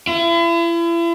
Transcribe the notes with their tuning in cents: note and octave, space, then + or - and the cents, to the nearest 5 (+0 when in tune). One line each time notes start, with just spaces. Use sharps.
E4 +40